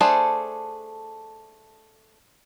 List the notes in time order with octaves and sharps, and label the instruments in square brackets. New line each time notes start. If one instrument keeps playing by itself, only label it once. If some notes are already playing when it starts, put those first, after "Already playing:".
[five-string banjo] A3 D4 G#4 A4 C5